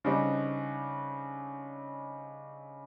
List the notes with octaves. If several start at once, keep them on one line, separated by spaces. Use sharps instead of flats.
C#3 G3 C4 D4 D#4